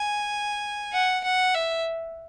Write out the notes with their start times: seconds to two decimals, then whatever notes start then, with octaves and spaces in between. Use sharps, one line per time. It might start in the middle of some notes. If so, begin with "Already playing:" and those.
Already playing: G#5
0.93 F#5
1.24 F#5
1.54 E5